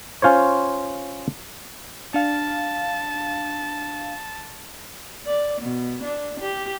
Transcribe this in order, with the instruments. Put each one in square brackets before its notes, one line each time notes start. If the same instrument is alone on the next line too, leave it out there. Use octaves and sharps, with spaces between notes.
[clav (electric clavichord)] C#4 F4 C5 C#5
[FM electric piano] D4 F5 [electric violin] A5
[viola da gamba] D5
B2
D4
G4